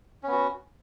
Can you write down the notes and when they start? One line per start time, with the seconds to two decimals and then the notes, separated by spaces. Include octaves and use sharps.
0.23 C#4
0.28 B3
0.32 F#4